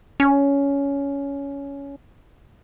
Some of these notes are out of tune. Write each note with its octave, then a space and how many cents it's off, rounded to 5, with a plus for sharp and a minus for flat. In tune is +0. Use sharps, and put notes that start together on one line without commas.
C#4 +15